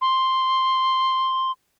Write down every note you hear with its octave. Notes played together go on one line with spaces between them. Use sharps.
C6